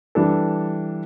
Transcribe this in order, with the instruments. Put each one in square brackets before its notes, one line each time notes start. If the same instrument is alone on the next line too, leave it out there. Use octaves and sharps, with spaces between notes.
[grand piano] E3 G3 D4 A4